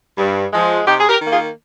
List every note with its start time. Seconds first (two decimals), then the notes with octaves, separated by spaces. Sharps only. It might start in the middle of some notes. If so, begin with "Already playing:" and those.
0.18 G2
0.53 F3 G#3
0.86 C3 D#4 G4
1.00 G#4
1.09 G4 A#4
1.21 D#3 A#3
1.31 F4 G#4